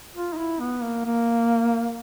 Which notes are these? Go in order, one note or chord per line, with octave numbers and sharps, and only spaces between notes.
F4
D#4
E4
B3
A#3
A#3